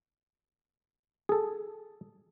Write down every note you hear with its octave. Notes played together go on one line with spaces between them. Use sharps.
G#4 A4